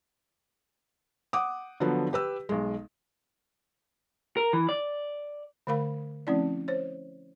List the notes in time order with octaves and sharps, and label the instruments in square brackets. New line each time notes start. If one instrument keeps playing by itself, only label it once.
[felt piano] F#5 D6 D#6
D3 F3 F#3 B3
G4 B4 E6
B1 G#3
[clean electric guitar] A#4
E3
D5
[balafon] D3 A3 A#4 F5 B5
F3 A3 C4 C#4 E4 D5
C5 C#5